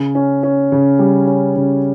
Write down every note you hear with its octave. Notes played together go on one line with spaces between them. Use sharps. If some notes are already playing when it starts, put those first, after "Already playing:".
Already playing: C#3
C#4
C#4
C#3
G3
C#4
C#3